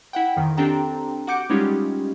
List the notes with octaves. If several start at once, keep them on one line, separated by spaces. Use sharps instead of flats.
E4 F#5 G5
F2 D#3
C4 D4 G4 A4 G5 A#5
F#4 F#5 D6 G6 C#7 D7
G3 G#3 C#4 D#4 F4 G4